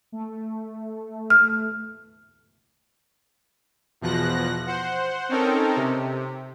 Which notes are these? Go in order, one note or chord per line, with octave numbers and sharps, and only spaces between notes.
A3
F6
E2 B2 F3 F#6 A#6
C5 F#5
C4 C#4 D#4 A4 A#4
C3